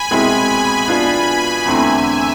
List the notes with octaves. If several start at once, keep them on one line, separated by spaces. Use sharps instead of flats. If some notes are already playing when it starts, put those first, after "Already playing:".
Already playing: G#5 B5
C2 B2 G#3 C4 E4
B2 B3 D4 F4 G#5 B5
E2 D3 A3 C4 E4 E5 G#5